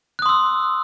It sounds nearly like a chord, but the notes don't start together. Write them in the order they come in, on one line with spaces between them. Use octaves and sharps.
F#6 D#6 C6 E6